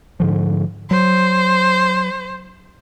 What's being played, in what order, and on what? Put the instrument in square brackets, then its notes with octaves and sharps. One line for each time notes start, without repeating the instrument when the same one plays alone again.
[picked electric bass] G#2 D3 F3
[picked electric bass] F#3 [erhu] C5